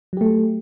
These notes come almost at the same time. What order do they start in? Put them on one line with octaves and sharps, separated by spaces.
F#3 G4 A3